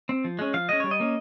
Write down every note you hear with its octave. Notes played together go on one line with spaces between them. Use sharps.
C4
F3
G#3 C#4
F3 F5
G#3 C#4 D#5
G3 C#5
D#5
A#3 C#4